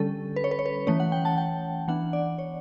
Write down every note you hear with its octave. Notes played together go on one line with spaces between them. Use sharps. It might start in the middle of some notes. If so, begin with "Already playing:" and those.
Already playing: D3 G3 C#4 A4
B4
C#5
B4
C#5
B4
E3 A3 C#4 C#5
F#5
G5
A5
G5
E3 B3 D4 F#5
D5
C#5